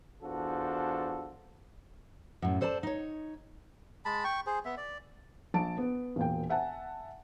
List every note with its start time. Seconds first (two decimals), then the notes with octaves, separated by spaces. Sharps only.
0.23 E2 D4 F4 F#4 A4 C5
2.42 F#2 A2
2.61 A4 C5 D5 F#5 A5
2.83 D#4 C#5
4.05 G#3 A5 B5
4.24 G5 C#6
4.46 G#4 C5
4.65 B3 E5
4.77 D5
5.54 A#1 A5 D7
5.77 B3
6.16 E1 A#2 G5
6.49 E5 F#5 G#5 A5